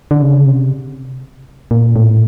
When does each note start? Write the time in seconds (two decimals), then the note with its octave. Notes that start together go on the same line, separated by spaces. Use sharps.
0.11 D3
0.22 C#3
0.47 C3
1.71 A#2
1.96 A2